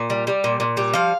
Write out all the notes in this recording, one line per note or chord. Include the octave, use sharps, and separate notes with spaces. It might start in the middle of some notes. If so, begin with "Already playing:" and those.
Already playing: A#2
G3
G3
A#2
A#2
G3
F3 F5